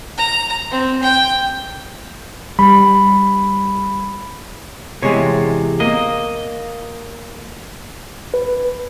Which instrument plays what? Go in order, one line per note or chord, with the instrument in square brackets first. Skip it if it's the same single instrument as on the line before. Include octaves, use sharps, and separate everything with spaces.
[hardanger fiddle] A#5
C4
G5
[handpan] G3 [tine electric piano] B5
[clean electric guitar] E2 C3 [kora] G#3 C#5
[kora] A#3 [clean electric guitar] D#5
[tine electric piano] B4